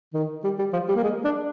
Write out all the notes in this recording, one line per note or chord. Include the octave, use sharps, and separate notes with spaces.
D#3
G3
G3
F3
G3
A#3
G#3
D4